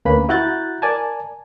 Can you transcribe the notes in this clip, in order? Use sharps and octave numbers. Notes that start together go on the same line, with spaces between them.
D2 A#3 C#4 B4 B5
E4 F#4 A#5 F#6 G6 A6
A#4 D5 G#5 A5